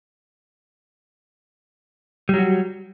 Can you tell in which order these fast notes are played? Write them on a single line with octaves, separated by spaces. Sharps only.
G3 F#3 F#4